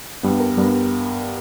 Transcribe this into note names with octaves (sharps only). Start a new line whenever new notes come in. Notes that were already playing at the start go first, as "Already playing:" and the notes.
G2 G3 B3
A#4
G2 G3 B3